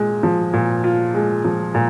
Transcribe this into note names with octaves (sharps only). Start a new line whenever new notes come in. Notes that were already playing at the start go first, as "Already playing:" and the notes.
Already playing: A#2 G#3
F3
A#2
F4
G#3
F3
A#2